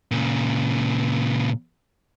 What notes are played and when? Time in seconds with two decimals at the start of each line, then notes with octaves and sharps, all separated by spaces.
0.11 A#2 C#3